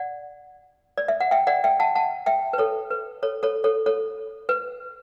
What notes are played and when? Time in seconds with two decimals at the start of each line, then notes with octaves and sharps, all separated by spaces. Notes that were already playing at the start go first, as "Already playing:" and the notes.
Already playing: D5 F#5
0.98 D5
1.08 E5
1.21 F#5
1.31 E5 G5
1.47 D5 F#5
1.64 E5 G5
1.80 F#5 A5
1.95 F#5 A5
2.26 E5 G5
2.53 B4
2.58 A4 C#5
2.91 B4
3.23 A4 C#5
3.43 A4 C#5
3.64 A4 C#5
3.86 A4 C#5
4.49 B4